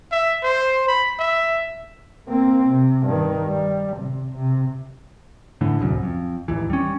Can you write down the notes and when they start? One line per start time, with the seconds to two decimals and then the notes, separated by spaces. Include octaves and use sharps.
0.12 E5
0.43 C5
0.88 B5
1.19 E5
2.28 A#3 C4
2.69 C3
3.06 G2 D#3
3.48 G3
3.97 C3
4.33 C3
5.61 A2 D3 E3
5.79 D1 C2 F#2
6.03 F2
6.48 A1 D#2 E3
6.70 G3 C#4